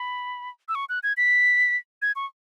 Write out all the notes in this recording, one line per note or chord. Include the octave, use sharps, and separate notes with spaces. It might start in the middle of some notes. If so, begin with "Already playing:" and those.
Already playing: B5
E6
C#6
F#6
G#6
B6
G#6
C#6